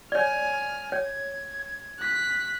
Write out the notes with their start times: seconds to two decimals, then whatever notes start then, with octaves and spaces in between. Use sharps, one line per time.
0.12 C#5 D5 G#5 F6
0.92 C#5 G#6
1.99 F#6 B6